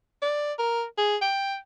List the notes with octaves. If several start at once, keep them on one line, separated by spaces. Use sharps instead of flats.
D5
A#4
G#4
G5